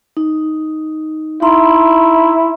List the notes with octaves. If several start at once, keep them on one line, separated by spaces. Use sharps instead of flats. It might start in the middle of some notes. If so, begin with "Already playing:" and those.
D#4
D#4 E4 A#5 C6